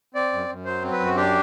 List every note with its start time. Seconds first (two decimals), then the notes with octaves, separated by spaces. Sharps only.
0.15 C4 D5
0.33 F#2
0.49 F#2
0.65 F#3 C5
0.82 C4
0.92 B4
1.00 F#2
1.05 F#4
1.16 D4 G4